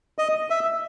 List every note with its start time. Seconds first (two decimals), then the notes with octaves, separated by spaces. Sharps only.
0.18 D#5
0.50 E5